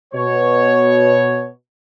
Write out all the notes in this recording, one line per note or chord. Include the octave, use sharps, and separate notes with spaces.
B2 C#5